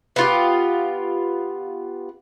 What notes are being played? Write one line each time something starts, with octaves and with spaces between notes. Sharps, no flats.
B3 F4 G4